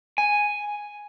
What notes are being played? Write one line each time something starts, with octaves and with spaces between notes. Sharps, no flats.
G#5